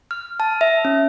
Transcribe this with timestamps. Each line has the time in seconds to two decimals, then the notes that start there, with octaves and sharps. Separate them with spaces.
0.11 F6
0.40 A5
0.61 E5
0.85 C#4